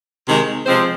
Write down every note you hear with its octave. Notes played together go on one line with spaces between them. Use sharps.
C3 D#3 G#3
C3 F3 G#3 C4 C5